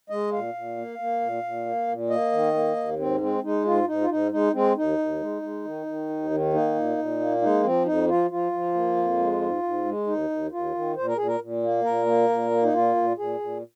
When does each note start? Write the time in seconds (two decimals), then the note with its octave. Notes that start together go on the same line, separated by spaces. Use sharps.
0.10 G#3 D#5
0.33 A#2 F5
0.54 A#2
0.77 A#3
0.99 A#3
1.21 A#2
1.43 A#2
1.65 A#3
1.88 A#2
2.10 A#3 D#5
2.32 D#3
2.54 A#3
2.76 D#2
2.99 G#2 C4
3.20 G#3 C4
3.43 G#3 D#4
3.64 G#2 F4
3.87 G#2 D#4
4.01 F4
4.09 G#2 D#4
4.32 G#3 D#4
4.53 G#3 C4
4.76 D#2 D#4
4.98 D#2
5.20 G#3
5.42 G#3
5.64 D#3
5.86 D#3
6.09 D#2
6.30 D#3
6.53 A#3 D#4
6.75 A#2
6.98 A#2
7.20 A#3
7.42 G#3 D#4
7.63 F3 C4
7.85 F2 D#4
8.08 F3 F4
8.30 F3 F4
8.52 F3
8.74 A#3
8.96 F2
9.18 G#3
9.41 G#2
9.63 G#2
9.85 G#3
10.07 D#2 D#4
10.30 D#2
10.52 D#2 F4
10.74 D#3
10.96 A#2 C5
11.07 A#4
11.17 A#2 G#4
11.27 A#4
11.40 A#2
11.63 A#3
11.84 A#2 A#4
12.06 A#3
12.29 A#2
12.51 A#3
12.63 D#4
12.73 A#2 F4
12.96 A#2
13.17 A#2 G#4
13.40 A#2